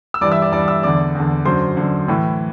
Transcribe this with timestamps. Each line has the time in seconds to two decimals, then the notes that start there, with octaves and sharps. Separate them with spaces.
0.14 E6
0.21 G2 E3 D5 D6
0.32 E5 E6
0.42 D5 D6
0.52 G2 E3 D5 D6
0.68 E5 E6
0.83 E2 D3 D5 D6
1.15 E2 D3
1.46 F#2 D3 C5 C6
1.77 F#2 D3
2.08 A2 E3